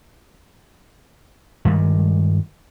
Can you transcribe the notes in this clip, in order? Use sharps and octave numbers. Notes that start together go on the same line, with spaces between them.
G2 D#3 G3 G#3